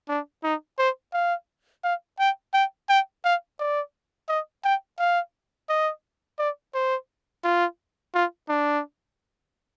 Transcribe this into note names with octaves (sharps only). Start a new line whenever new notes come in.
D4
D#4
C5
F5
F5
G5
G5
G5
F5
D5
D#5
G5
F5
D#5
D5
C5
F4
F4
D4